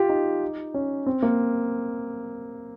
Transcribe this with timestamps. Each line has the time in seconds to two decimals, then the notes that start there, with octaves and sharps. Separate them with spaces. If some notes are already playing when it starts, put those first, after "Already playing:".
Already playing: F4 G4
0.09 D#4
0.74 C#4
1.06 C4
1.22 A#3